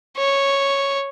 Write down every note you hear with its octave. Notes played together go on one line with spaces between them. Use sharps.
C#5